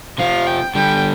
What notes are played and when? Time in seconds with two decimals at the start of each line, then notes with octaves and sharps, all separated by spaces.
0.18 C3 F3 F5
0.47 G5
0.74 D3 G3 G5